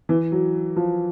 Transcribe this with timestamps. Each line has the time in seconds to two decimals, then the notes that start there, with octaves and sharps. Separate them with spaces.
0.09 E3
0.32 F#3
0.77 F3